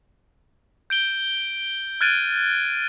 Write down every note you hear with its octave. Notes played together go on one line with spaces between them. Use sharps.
G6 D7 G7
F6 F#6 G#6 A6 D7 D#7